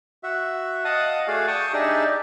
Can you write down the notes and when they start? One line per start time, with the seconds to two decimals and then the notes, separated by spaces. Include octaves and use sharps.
0.23 F#4 E5
0.85 D#5 F5 F#5 A5 D#6
1.28 A3 F#4 G#4 D5 F5
1.47 G5 A5 C#6 D#6
1.73 D4 D#4 G4 G#4 D5 E5